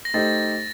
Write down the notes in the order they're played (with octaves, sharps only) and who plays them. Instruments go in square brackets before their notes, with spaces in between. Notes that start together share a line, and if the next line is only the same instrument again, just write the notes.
[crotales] A#6
[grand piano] A3 D#4 G4 C5 D#5 [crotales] A6